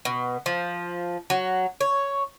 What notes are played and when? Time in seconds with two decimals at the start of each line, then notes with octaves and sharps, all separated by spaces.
0.05 B2
0.46 F3
1.30 F#3
1.81 C#5